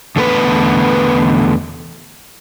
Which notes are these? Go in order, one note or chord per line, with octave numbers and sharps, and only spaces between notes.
E2 D3 A3 B3 E4 B4